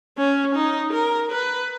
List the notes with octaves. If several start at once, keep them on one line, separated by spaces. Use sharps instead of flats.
C#4
D#4
A#4
B4